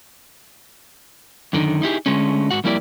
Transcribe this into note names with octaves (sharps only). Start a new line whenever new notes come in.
F#2 D3 D#3
D#4 E4 G4 G#4
D3 G#3 A3 C#4
G#2 F#4 F#5
F2 G3 A#3 E4 G4 D5